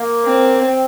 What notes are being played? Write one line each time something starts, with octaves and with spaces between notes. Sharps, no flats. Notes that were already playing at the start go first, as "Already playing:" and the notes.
Already playing: A#3
C4
C4